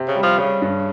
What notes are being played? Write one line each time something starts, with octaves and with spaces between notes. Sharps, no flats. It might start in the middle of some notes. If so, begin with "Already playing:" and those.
Already playing: C3
C#3
G3
F3
C#3 G3
G2